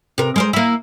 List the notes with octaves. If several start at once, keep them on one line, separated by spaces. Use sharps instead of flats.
C3 A#4
G#3 A#4 C5
A#3 E4